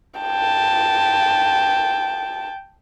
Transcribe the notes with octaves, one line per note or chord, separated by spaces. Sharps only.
G5 A5